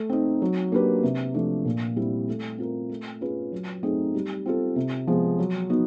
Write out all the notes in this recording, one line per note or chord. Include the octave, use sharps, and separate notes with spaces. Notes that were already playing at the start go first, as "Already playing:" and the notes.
Already playing: A3
C4 D#4
F#3
A#3 D4 G4 B4
C3
F3 A3 D4
A#2
G3 C4 E4
A3
C4 F4 A#4
A3
C#4 F4 G#4 B4
F#3
A3 C4 D#4 G#4
G3
C4 F4 A4
C3
F3 G#3 B3
F#3
B3 D#4 F#4